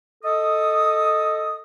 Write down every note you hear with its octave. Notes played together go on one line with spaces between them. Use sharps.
A4 D#5 D#6